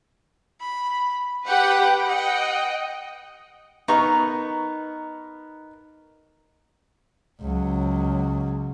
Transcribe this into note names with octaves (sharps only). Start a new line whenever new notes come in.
B5
G4 B4 F#5 G5
D#5 F#5 G5
B3 D#4 A#4 C#6
C#2 F#3